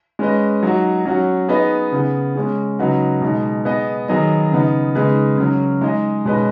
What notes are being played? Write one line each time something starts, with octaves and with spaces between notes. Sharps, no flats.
G#3 C#4 B4 D#5
F#3 D#4 F#4
F#3 C#4 F#4
B3 D#4 G#4 B4 D#5
C#3 B3 G#4
G#3 C#4 G#4
C#3 F#3 D#4 F#4 B4
B2 G#3 D#4
B3 G#4 B4 D#5
D#3 F#3 B3 G#4 D#5
C#3 B3 D#4
C#3 G#3 D#4 G#4 B4
C#3 F#3 C#4
G#3 D#4 G#4 D#5
B2 G#3 C#4 B4 D#5